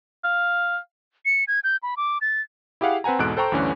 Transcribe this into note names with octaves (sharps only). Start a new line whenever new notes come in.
F5
C#7
G#6
G6
B5
D6
A6
E4 G4 G#4 F5 F#5
C4 B4 F#5 G#5 A#5
E2 G#2 B2 A4 F#6 D7
A4 C5 G5 A#5 C#6
D2 G2 D3 E3 C#4